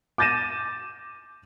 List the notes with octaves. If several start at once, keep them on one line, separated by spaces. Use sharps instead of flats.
D6 G6 A6 A#6 D#7 E7